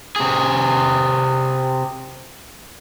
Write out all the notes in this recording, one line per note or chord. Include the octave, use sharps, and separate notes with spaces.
C3 G#4